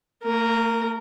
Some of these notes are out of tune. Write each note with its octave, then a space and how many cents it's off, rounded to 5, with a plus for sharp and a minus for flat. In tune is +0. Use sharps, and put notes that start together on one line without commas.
A3 +45 A#4 -10